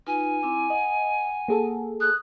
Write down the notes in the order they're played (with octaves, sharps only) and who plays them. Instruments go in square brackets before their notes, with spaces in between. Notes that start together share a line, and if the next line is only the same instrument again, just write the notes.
[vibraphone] D#4 F4 B4 [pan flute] G#5
[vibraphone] C4 E4 D6
[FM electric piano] D#5 [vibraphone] F#5
[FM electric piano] A#3 G#4 A4
[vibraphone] D#6 [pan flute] F#6